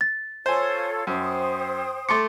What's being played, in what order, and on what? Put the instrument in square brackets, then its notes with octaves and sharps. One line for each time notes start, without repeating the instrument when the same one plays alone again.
[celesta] A6
[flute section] F4 A4 C#5 [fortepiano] C5 G#5
[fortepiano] F#2 [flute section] C5 G5 D#6
[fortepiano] A3 C6 D6 [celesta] A6 C#7